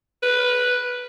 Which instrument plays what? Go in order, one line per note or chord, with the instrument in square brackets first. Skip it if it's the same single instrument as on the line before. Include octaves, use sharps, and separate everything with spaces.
[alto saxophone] B4